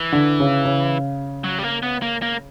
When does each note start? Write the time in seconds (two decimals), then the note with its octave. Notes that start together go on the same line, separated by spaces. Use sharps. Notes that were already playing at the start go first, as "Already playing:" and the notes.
Already playing: E3
0.13 D3
0.40 C#3
0.65 C#3
1.44 F#3
1.59 G3
1.63 A#3
1.83 B3
2.02 A#3
2.22 A#3